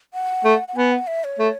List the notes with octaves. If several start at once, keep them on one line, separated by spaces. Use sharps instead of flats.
F#5
A3
F#5
B3 G#5
F#5
E5
C#5
A3